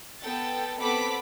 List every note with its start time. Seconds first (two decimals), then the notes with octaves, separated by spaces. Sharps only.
0.22 B3 A4 G5 A6
0.79 B3 C4 A4 B5 D6 B6